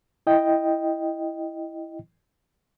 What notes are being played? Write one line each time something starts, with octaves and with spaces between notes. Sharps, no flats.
E4 D#5 G5